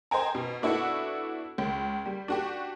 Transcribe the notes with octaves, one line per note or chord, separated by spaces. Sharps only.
C5 D#5 G5 G#5 A#5
B2
B3 D4 E4 F#4 A4 F#5
C#2
G3
D4 F#4 G4